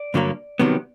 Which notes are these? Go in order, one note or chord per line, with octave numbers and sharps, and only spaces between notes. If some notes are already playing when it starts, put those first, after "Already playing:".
Already playing: D5
G2 D3 F#3 A#3
C2 C3 D#3 F#3 B3